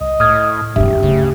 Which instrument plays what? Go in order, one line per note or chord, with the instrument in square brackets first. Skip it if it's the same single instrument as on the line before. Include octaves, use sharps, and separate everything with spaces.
[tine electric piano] C2 [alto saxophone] D#5
[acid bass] A2 [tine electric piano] D#6 F6 G#6
[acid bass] E1 [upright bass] G2 C4 [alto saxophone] G4 [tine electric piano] E5
[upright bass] D2 [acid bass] C#3